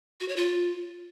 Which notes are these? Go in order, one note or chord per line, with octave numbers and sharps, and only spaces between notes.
F#4
C#5
F4